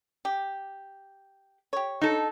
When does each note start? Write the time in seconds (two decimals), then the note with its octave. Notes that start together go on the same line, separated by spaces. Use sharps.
0.25 G4
1.73 G4 C#5
2.01 D#4 A4